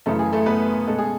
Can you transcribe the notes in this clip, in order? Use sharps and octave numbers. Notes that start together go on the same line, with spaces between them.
F#2 C#3 E3 A3 A4
G#4
A3 A4
B3 B4
B2 G#3 C#4 A4
G#4